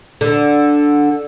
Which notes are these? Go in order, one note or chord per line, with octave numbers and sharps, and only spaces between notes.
D3